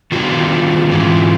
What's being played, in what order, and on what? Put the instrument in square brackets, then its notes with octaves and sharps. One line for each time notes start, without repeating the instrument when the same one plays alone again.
[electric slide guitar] D#3 G3 B3 D4 F#4 [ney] F4
[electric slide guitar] G#2 E3 G#3